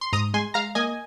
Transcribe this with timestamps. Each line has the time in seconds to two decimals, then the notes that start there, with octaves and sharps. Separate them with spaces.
0.01 C6
0.13 G#2 A#5 D#6
0.34 G#3 G#5 C6
0.54 G#3 F5 A#5
0.75 A#3 D#5 G#5